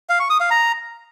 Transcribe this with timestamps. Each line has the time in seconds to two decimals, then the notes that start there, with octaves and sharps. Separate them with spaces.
0.09 F5
0.20 C#6
0.30 D#6
0.40 F5
0.51 A#5